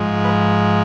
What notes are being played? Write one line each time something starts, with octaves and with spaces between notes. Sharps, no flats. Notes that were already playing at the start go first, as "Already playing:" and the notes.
Already playing: G#2 F3 G#3
B4